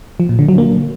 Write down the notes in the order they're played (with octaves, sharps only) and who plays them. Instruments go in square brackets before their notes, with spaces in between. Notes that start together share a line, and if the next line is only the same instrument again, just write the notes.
[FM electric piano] F3
A#2
D3
F#3
A#3